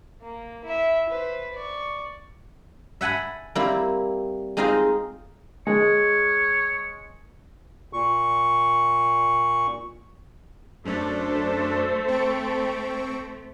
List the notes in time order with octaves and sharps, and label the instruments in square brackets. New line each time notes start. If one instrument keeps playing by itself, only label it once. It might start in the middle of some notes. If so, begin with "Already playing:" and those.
[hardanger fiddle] A#3
E4 E5
B4 C5
D5 C#6
[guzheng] E5 F#5 G#5 A5 B5
G3 A#3 C4 E4
G#3 C4 D#4 F4 C5 D#5
[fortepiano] G#3 [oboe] C#5
[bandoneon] A#2 C#6
[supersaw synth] F#2 D4 [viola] A3 [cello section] A4 C5
[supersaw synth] C4 C#6 D7